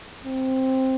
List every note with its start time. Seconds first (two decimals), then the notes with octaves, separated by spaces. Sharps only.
0.25 C4